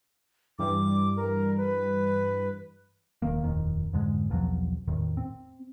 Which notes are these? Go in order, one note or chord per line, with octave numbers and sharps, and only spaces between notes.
G2 E3 G3 D6
A#4
B4
E1 D#3 A#3
D#1 F2 D#3
F2 G#2 D3 G#3
B1 E2 F3 F#3
E2 A2 D#3
C4